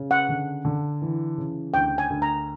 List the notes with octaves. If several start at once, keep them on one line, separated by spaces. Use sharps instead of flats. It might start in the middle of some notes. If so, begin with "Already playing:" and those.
Already playing: C#3
F#5
D3
D3
E3
C#3
D2 G5
G#5
D2
A#5